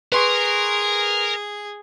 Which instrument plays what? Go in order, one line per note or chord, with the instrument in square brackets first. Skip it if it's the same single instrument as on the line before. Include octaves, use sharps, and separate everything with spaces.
[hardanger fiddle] G#4 [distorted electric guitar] A#4 [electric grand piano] B4 C6 C#6